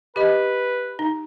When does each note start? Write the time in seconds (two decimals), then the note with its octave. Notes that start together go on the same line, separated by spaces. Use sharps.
0.16 G4 B4 D#5
0.99 D#4